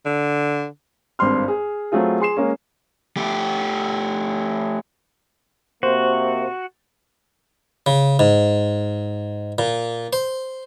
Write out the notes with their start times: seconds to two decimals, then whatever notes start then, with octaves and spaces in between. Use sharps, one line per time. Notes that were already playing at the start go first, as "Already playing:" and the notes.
0.05 D3
1.19 G#1 G2 C4 C6 F6
1.48 G#4
1.92 F#3 A3 C4 F4 G#4
2.20 G#4 C6 C7 E7
2.37 G#3 A#3 C#4
3.17 A3 G4
5.83 C3 A#3 F#4 C5
7.86 C#3
8.19 G#2
9.58 A#2
10.13 C5